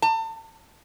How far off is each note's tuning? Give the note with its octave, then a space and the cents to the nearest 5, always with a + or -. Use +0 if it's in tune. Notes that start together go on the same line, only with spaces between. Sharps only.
A5 +35